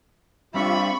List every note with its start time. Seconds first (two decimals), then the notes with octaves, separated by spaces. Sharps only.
0.54 G3 C4 D4 F4 G4 E5 B5 C#6